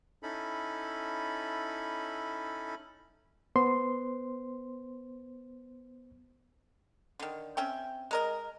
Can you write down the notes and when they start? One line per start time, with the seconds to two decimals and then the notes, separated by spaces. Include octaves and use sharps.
0.23 C#4 D#4 E4 A4 B5
3.56 B3 C5 C6
7.19 D3 D#3
7.57 C4 C#4 E5 G5
8.11 G#3 A#4 D#5